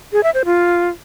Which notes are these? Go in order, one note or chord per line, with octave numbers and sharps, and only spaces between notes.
G#4
E5
C5
F4